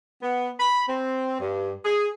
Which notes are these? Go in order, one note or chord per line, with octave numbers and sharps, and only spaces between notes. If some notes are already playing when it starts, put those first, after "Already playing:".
B3
B5
C4
G2
G#4